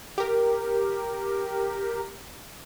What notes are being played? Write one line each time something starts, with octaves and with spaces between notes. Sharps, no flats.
G4 A#4